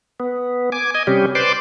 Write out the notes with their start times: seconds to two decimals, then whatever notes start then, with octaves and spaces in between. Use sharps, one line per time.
0.20 B3
0.72 G#5 D6
0.95 D#5 G#5
1.07 C3 G3 C#4 G4
1.35 B4 C5 D5 C6 D6